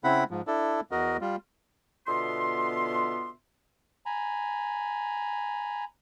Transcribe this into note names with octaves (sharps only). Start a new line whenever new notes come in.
C#3 C4 E4 F#5 B5
G#2 F3
D4 E4 A4
E2 F#4 A#4 D#5
G3 F4
B2 D3 B3 F4 E5 C6
G#5 A#5 B5